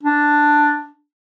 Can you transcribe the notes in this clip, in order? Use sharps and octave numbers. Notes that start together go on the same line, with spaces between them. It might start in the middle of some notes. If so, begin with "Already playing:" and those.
D4